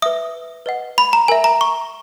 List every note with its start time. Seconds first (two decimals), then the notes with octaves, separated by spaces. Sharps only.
0.02 B4 E5 D#6
0.66 B4 D#5 F#5
0.98 B5
1.13 A#5
1.28 A#4 E5 G#5
1.44 A#5
1.61 C#6